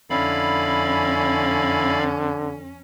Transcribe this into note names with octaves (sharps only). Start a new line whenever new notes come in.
F2 D3 C#4 E4 D5 F5 B5